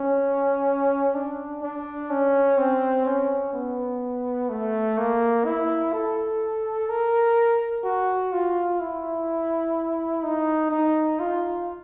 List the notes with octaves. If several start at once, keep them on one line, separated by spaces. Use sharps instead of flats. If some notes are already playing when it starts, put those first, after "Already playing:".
Already playing: C#4
D4
D4
C#4
C4
C#4
B3
A3
A#3
E4
A4
A#4
F#4
F4
E4
D#4
D#4
F4